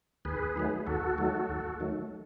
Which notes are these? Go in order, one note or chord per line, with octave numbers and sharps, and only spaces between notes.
D#2 G#4 B4
D#3 F#3 A3
D#2 F#4 A4
D#3 F#3 A3
D#2
D#3 F#3 A3